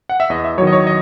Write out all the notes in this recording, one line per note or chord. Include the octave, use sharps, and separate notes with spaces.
F#5
E5
E2 D#5
E5
D#3 F#3 C#5
D#5
C#5
D#5